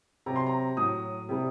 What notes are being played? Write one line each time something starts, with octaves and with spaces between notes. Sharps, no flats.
C3 F#3 A#5
C6
A#5
A2 F#3 D#6
C3 G3